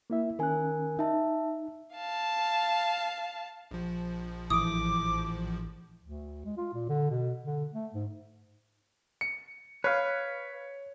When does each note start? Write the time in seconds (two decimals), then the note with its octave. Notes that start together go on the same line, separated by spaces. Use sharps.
0.10 A#3 E4 E5
0.39 D#3 C#4 A#4 G#5 F#6
0.99 D#4 E5 A5
1.94 F5 A5
3.71 A#1 F3
4.50 A1 E3 D6 D#6
6.03 D2
6.45 G#3
6.57 F4
6.74 A#2
6.89 D3
7.11 B2
7.45 D3
7.74 A3
7.94 G#2
9.21 C#7
9.84 B4 C#5 F5